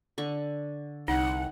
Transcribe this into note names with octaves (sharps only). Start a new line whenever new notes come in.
D3 C#6
C2 D#4 F#5